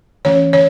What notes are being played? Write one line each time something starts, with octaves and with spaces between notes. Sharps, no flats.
E3 A3 C#4 C#5
C#5